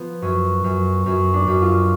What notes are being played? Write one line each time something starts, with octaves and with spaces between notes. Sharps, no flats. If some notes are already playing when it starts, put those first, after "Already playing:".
Already playing: F3 B3
F#2 C#4
F#2
F#2 C#4
D4
F#2
F4